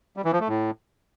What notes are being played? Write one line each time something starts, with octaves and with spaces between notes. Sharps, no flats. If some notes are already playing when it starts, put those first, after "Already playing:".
G3
E3
F3
A3
A2